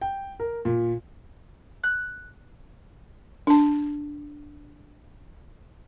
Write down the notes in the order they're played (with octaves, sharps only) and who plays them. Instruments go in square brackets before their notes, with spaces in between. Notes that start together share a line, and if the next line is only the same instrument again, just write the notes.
[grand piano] G5
A#4
A#2
[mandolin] F#6
[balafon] D4 A5